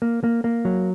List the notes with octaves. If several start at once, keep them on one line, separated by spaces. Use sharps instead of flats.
A#3
A#3
A#3
F#3